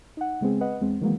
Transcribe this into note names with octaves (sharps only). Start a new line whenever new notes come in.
D#4 F#5
C#3 G#3 B3 C4 G#4
B4 D#5 F#5
E2 G#3 C4
D#3 E3 F#3 G#3 A#3 B3